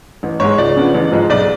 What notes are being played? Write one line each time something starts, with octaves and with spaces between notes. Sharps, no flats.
A1
G#2 G#3 C#5
C#2 D5
C#3 F3 B3 D4
A1
G#2 F3 G#3
B1 D5